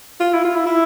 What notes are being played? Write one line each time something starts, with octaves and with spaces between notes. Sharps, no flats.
F4
E4
F4
E4
E4